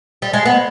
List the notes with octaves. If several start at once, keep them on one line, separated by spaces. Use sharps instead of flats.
G3
G#3
B3